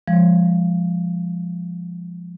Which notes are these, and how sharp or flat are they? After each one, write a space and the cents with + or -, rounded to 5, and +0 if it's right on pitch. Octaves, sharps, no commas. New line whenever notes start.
F3 +0 G#3 -20